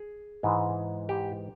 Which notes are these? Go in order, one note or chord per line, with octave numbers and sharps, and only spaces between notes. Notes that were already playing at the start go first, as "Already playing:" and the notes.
Already playing: G#4
G#2 E3 G#3
G4